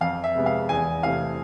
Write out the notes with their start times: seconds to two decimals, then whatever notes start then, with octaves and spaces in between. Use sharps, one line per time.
0.01 F2 F5
0.24 E5
0.35 C3 G#3 B3
0.46 F5
0.69 E2 G#5
1.03 C3 E3 A3 F5